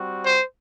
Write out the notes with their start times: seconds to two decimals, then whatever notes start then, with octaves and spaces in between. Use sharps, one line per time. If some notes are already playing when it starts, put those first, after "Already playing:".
Already playing: G3 C4 F#4
0.25 C5